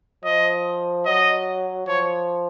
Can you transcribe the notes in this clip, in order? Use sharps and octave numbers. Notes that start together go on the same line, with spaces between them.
F3 D#5
F#3 D#5
F3 C#5